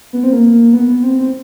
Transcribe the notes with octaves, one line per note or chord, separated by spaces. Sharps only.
B3
C4
A#3
B3
B3
C4
C4